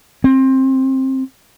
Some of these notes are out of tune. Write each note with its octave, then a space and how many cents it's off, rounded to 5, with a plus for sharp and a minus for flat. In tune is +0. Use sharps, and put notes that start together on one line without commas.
C4 +20